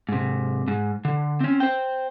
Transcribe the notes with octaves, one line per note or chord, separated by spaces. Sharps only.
G#2 C3
G#2
D3
C4 C#4
C5 G5